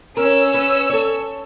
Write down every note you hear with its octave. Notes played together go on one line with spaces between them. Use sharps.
C#4 A#4 E6
B4
A4 C#5